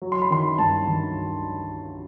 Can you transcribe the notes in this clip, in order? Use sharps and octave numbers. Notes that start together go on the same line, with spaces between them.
F#3
C6
B5
D#3 C6
G2 A5
D#3